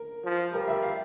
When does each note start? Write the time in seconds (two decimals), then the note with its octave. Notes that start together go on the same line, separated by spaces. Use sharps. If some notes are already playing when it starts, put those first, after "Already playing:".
Already playing: A#4
0.24 F3
0.52 G3 A#4
0.68 E5
0.82 F5